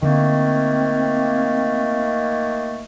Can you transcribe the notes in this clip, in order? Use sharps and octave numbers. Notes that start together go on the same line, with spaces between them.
D3 D#3 A3 A#3 C4